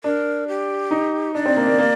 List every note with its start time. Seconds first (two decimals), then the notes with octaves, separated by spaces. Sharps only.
0.04 D4 A#4
0.48 G4
0.91 D#4
1.35 D4 D5
1.46 C4
1.56 A#3
1.67 A#3
1.78 A#3